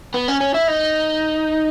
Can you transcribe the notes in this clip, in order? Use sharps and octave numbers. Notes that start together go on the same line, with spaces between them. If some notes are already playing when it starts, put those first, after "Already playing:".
B3
C#4
C#4
E4
D#4